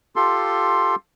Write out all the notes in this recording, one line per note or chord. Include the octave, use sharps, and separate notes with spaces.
F4 G4 A4 C6